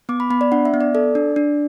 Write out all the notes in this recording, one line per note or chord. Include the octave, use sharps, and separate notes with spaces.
B3 D6
B5
B3 B5
D5
D4 F#5
E5
B3
D5
A4 D5
D4
D4